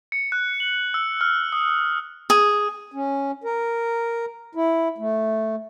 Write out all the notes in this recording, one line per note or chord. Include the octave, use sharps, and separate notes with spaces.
C#7
F#6
F#7
E6
F6
D#6
G#4
C#4
A#4
E4
A3